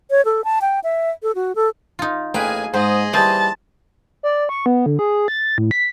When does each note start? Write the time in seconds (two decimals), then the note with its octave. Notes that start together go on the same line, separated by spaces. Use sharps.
0.11 C#5
0.25 A4
0.44 A5
0.61 G5
0.84 E5
1.23 A4
1.35 F#4
1.55 A4
1.99 D#4 F4
2.34 A1 A#3 G#4 A#4 B4 G5 G#5
2.74 G#2 G#4 C5 D#5
3.13 E3 G3 C5 A5
4.23 D5
4.49 C#6
4.66 B3
4.86 D3
4.99 G#4
5.28 A6
5.58 A2
5.71 B6